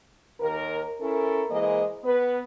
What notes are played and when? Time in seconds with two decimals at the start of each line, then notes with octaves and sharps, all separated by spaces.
0.40 D#2 A#4
1.01 C#4 E4 A4 A#4
1.50 E3 G#3 A#3 G#4 C5 D#5
2.04 B3 B4